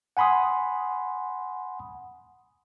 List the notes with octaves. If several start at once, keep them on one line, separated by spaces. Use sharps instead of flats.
F#5 G#5 B5 C6 D#6